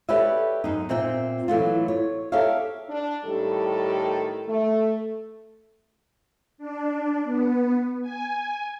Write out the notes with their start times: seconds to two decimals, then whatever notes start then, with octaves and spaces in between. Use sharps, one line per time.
0.09 G4 A4 B4 C#5 D5 E5
0.64 F#2 D#4
0.89 A#2 C4 E5 G5
1.48 E3 F#3 A3 F4
1.88 C#5
2.32 G4 A4 A#4 C#5 E5 F5
2.89 D4
3.25 A2 D#3 G3 G4 A4
4.47 A3
6.58 D4
7.24 B3
8.02 G#5